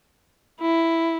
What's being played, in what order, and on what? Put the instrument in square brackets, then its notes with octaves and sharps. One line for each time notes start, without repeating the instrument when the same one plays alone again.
[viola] E4